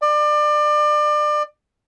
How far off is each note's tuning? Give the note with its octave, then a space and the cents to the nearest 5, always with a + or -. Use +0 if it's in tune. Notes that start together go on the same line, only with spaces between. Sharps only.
D5 +30